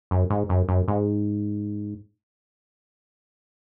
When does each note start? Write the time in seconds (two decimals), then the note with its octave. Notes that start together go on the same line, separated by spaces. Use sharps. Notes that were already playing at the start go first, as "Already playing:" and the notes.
0.11 F#2
0.30 G#2
0.49 F#2
0.69 F#2
0.88 G#2